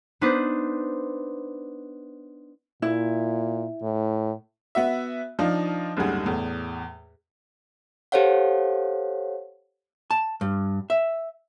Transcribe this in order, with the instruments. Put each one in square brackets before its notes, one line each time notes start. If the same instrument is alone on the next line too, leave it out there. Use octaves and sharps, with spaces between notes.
[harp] B3 D4 D#4 B4 C5
[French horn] A#2 [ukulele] E4
[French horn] A2
[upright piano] B3 F#4 E5
F3 D4 D#4 F4
F#1 D2 G#2 G3 G#4 F#5
E2 A2
[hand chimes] G4 A4 C5 C#5 F5 F#5
[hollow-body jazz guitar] A5
G2
E5